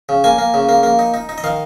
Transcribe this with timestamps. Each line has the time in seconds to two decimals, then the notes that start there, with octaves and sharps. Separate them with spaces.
0.09 C#3
0.24 A#3 G#5
0.38 A#3
0.54 C#3
0.69 A#3
0.83 A#3
0.99 D#4
1.14 D#4
1.29 D#4
1.38 D#5
1.44 D#3 F5